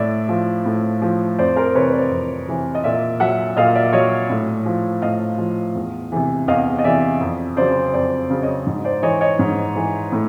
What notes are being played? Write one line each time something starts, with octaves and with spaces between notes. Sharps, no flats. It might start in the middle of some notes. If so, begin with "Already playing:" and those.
Already playing: A2 D5 E5
F3
A2
F3
F2 C5 D5
A#4 C5
C3 E3 B4 C#5
C5 D5
F2
C3 E3
D#5
A#2 D5 E5
F#3 E5 F#5
A#2 D#5 F5
D5 E5
F#3 C#5 D#5
A2
F3
A2 D#5 F5
F3
E2
C3 E3
E2 D#5 F5
D#5
C3 E3 D5 E5
F2
C#3 F#3 C5 D5
F2 C5 D5
C#3 F#3
C#5 D#5
G#2
C5 D5
E3 C#5 D#5
C#5 D#5
G#2
E3
A2